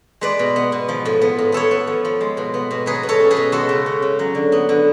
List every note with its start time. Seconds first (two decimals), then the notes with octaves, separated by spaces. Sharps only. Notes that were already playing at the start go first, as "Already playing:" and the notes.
0.21 G#3 B4 D5
0.39 B2
0.56 B3
0.72 B2
0.89 F3
1.05 A2
1.22 B3
1.38 A2
1.52 B3 A4 C#5
1.71 B3
1.87 F3
2.05 F3
2.21 G#3
2.37 B2
2.54 B3
2.71 B2
2.86 F#3 G#4 B4
3.03 B2
3.09 A4 C#5
3.20 C#4
3.31 G#4 B4
3.36 B2
3.52 G#3 F#4 A4
3.69 C#3
3.86 C#4
4.02 C#3
4.19 F#3
4.35 D3
4.52 B3
4.69 D3